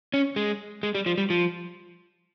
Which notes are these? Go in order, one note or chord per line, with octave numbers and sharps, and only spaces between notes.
C#4
G#3
G#3
G3
F3
G3
F3